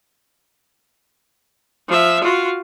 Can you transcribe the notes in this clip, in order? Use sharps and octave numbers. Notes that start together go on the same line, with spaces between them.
F3 E5
F4 F#4